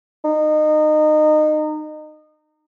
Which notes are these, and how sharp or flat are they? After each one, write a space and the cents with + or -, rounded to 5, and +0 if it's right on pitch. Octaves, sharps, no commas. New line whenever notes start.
D#4 -25